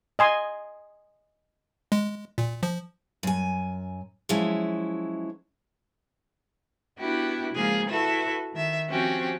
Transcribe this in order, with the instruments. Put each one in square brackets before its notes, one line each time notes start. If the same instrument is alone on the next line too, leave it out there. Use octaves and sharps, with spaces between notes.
[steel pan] D#5 G#5 C6
[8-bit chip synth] G#3
A#2
F3
[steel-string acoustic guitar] F#2 G#5
F3 F#3 G#3 C#4 E4
[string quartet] B3 D4 E4 F#4 G4
C#3 F3 G#3 A#3 F4 G#4
E4 F#4 A4 B4 E5
D#3 E5
F3 C4 C#4 F#4 G4